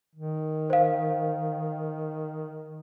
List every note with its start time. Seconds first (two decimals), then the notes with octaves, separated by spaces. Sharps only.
0.15 D#3
0.70 C5 F5